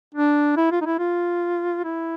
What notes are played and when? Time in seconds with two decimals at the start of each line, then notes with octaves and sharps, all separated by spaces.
0.15 D4
0.57 E4
0.72 F4
0.81 D#4
0.86 E4
0.99 F4
1.84 E4